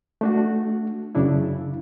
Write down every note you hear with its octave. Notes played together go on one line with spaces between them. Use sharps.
A3 D4 F#4
F#2 C#3 D4 E4